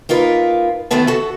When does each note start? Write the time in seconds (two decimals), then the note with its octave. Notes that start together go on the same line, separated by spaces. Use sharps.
0.09 A#3 D#4 F4 A#4 B4
0.91 D2 D#3 A3 B3 E4 A5
1.07 F#4 A4